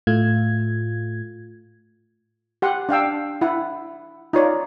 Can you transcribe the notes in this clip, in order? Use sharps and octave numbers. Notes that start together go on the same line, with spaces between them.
A2 A3 F4 G#6
G4 F#5 C6
D4 F5 G5 E6
E4 F#5
D#4 F4 C#5 D5